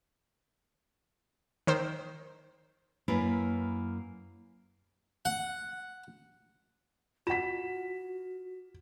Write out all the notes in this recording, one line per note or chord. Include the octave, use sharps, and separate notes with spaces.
D#3 C5 E6
F#2 A#3 E4 A#4 B4
F#5
F4 F#4 F#5 B6 E7